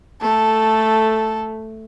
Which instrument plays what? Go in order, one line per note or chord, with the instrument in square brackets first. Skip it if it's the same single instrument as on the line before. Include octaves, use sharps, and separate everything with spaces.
[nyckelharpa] A3 [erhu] A4